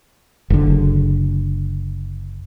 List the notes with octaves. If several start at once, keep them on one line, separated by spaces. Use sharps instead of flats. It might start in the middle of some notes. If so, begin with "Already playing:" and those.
F#1 D3